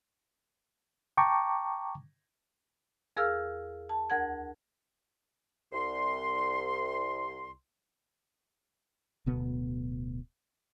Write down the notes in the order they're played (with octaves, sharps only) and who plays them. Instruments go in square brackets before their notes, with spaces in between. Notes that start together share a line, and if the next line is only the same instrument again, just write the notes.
[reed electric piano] G5 A5 A#5 C#6 D6
[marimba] E2 G#4 A#4 F5 E6 F6
A5
D2 A#4 F#5 G#6
[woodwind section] C2 C6
[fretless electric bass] D1 D2 B2 B3